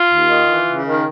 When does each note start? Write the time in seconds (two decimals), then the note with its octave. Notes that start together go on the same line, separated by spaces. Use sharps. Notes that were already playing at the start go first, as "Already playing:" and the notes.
Already playing: F4
0.09 D#2
0.28 D#3
0.47 E3
0.66 C#3
0.85 D#3